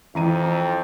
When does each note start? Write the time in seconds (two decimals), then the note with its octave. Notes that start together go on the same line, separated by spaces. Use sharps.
0.15 F2 E3 A#5 D#7